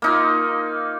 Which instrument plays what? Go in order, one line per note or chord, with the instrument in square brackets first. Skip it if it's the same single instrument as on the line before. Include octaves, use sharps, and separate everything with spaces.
[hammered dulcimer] A#3 D#4 F4